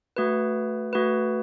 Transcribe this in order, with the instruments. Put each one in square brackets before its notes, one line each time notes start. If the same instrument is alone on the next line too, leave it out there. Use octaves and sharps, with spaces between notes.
[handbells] A3 F#4 B4
A3 F#4 B4